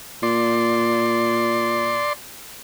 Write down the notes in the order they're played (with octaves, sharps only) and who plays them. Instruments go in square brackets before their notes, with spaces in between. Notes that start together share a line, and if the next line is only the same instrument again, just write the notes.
[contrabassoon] A#2 [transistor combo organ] D5 C6